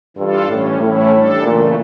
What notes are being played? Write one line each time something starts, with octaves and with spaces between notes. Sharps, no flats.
G2 E3 G3 D4 F4 A4
A2 E3 G3 C#4
A2 E3 A3 C#4 E4
G3 D4 A4
A#2 C#3 E3 A3